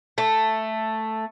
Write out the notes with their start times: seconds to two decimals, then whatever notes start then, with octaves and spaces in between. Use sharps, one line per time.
0.18 A3